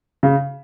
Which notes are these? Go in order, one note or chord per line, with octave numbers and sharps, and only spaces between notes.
C#3